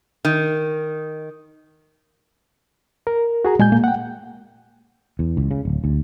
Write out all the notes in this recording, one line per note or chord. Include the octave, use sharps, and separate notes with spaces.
D#3
A#4
F#4 G#4 A#5
A#2 G#3 G#5 G6
A#3
F#5 G5
E2
C#2
C#3
D1
D2